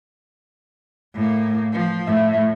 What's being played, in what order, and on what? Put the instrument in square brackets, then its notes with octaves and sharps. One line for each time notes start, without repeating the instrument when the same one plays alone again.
[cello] A2 A#3
F3
[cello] A2 [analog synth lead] E5